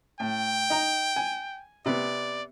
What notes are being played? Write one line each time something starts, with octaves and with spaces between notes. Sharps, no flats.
A2 G5
D#4 A#5
G#5
C3 B3 D5